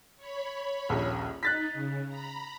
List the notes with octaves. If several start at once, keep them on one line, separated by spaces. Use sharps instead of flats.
C#5 B5
D#1 A#1
D#4 F#6 A6 B6
C#3
A#5 B5